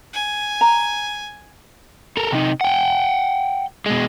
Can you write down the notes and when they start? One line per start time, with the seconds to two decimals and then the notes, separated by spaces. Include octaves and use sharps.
0.14 G#5
0.61 A#5
2.17 A4 A#4
2.32 C3 D#4
2.61 F#5 G5
3.86 B2 G#3